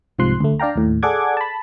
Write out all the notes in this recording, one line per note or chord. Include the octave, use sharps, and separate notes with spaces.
C2 G#2 C3 F3 C6 F#6
D2 A3
D4 D5 F5 G5 A#5
D#2 A2
G#4 A4 D5 F#5 D6 G#6
A5 B5